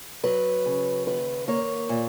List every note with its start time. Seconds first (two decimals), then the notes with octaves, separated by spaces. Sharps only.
0.24 F#3 B4
0.66 C#3
1.07 D#2 B4
1.48 A#3 C#5
1.89 A#2